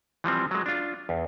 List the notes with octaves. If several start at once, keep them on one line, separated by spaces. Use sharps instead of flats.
E3 F3 G3 C4
F#3 G#3
D4 F4
E2